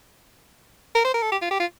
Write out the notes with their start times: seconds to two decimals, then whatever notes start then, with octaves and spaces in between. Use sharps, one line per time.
0.95 A#4
1.04 C5
1.14 A#4
1.22 A4
1.32 G4
1.42 F4
1.51 G4
1.60 F4